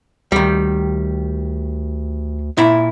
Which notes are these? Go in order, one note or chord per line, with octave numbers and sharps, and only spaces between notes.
D2 D#3 G3
A#2 E4